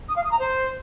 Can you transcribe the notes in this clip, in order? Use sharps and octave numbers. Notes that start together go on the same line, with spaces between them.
D#6
F5
D#6
A#5
C5